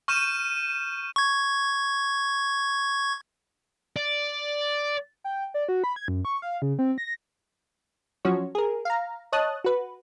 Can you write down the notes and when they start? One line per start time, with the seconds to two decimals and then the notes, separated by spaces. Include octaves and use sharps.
0.08 C#6 F6 G6 D#7 E7
1.16 C#6 G#6
3.96 D5
5.24 G5
5.54 D5
5.69 F#4
5.84 B5
5.96 G#6
6.08 F#2
6.25 C#6
6.42 F5
6.62 C#3
6.79 C4
6.98 A#6
8.25 F3 F#3 C#4 F#4 C#5
8.55 G#4 A#4
8.85 F5 A#5
9.32 C#5 D#5 A5 D#6 F#6
9.64 F#4 B4